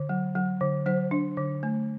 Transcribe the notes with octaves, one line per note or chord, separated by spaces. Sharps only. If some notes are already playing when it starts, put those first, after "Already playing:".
Already playing: D3
F#3
F#3
D3
F#3 C5
D4
D3
A3